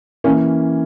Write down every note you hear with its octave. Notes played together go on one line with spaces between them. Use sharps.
E3 A#3 C#4